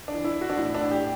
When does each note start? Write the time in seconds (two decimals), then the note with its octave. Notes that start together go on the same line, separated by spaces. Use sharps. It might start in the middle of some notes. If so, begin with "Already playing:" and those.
0.08 D4
0.14 E3
0.24 E4
0.36 E3
0.41 F#4
0.50 D4
0.57 A2 E4
0.75 D4
0.80 A2
0.91 G4